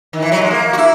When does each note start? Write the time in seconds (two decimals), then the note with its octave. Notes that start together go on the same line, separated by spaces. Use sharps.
0.13 D#3
0.22 E3
0.32 F#3
0.42 G#3
0.51 A#3
0.73 F#4
0.77 E4